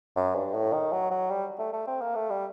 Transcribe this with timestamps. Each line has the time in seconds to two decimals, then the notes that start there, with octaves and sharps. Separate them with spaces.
0.16 F#2
0.35 G2
0.54 A2
0.73 D#3
0.93 F#3
1.11 F#3
1.30 G3
1.59 A3
1.73 A3
1.87 C4
2.01 A#3
2.15 A3
2.30 G3